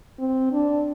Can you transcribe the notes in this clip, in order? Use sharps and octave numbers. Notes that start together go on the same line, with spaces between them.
C4
D4